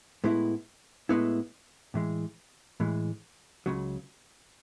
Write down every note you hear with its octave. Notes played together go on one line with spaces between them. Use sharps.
A2 G#3 B3 E4
A2 G#3 B3 E4
A2 E3 G#3
A2 E3 G#3
C#2 C#3 F#3